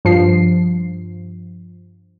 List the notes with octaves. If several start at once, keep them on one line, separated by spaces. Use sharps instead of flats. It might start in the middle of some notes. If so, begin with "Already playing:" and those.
G2 F3 C7